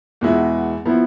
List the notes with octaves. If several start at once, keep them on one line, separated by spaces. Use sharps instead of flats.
E2 B2 G#3 B3 E4
F3 B3 E4